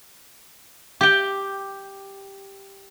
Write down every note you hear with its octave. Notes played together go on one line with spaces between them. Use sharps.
G4 G5